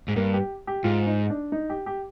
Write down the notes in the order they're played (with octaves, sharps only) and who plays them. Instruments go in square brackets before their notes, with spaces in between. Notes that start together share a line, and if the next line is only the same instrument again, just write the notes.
[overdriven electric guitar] G#2
[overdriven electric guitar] G2 [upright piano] A#3
[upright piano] G4
G4
[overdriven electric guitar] G#2 [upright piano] F4
[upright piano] D#4
D4
D#4
G4
G4